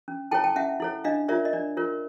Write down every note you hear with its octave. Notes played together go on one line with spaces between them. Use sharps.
C#4
E4 A4 C#5 G5 A5
G5 A5
C#4 E5 F#5
E4 A4 C#5
D4 D#5 F5
F4 A#4 C#5 D5 E5
D#5
D4 D5
F4 A#4 C#5